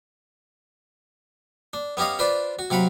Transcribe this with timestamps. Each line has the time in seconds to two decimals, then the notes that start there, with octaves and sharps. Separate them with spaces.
1.73 D4
1.97 B3 C#4 G4 D#5 F5
2.19 D4 F4 B4 C5 D5
2.59 F#4
2.70 C3 F#3 F5 F#5 B5